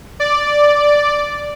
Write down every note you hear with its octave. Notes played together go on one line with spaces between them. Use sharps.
D5